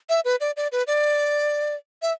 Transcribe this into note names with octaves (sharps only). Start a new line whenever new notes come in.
E5
B4
D5
D5
B4
D5
E5